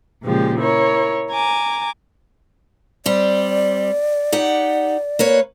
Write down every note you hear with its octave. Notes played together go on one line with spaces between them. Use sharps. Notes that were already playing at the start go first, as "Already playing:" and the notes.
A#2 C#3 F3 G#3 G4
E4 A#4 C#5
G#5 A#5 D6
G3 C4 D5
D#4 G4 F#5
A#3 B4 C#5